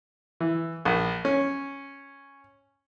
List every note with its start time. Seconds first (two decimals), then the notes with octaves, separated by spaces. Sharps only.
0.40 E3
0.85 A#1
1.25 C#4